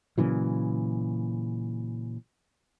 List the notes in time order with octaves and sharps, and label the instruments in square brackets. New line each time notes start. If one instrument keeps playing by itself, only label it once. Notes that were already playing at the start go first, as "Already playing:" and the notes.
[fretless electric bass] A#2 C#3 E3 F#3